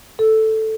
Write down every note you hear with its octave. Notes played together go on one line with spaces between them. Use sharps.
A4